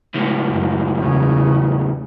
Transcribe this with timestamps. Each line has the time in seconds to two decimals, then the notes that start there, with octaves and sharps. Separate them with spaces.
0.15 C#2 A2
0.48 F#2
0.97 E2 C#3